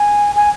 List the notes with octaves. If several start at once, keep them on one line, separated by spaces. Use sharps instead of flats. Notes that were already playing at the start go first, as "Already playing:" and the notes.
Already playing: G#5
G#5